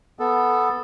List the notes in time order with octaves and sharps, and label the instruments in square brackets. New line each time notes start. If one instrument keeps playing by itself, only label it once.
[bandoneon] B3 A4